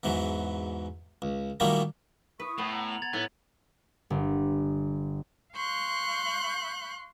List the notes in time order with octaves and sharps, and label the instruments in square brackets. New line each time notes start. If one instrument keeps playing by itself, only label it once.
[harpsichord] E2 G#2 E3 F#3
C#2
A#2 D#3 F#3 G3 A3 A#3
[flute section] E4 C#6 D#6 [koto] B4
[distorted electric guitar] A2 [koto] B3
[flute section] F#5 [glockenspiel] A#5
[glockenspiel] F7 F#7
G#6 A6 F7
[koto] A2 [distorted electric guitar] B3
[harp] G1
[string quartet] F5 C6 C#6 F#6 G6